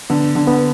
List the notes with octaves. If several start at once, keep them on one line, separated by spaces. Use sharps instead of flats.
D3 B3
D3
B3